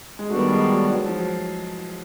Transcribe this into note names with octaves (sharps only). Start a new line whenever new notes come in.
G#3
D#3 G3 A3 B3 D4 F#4
G#3
F#3
F#3
F3
F#3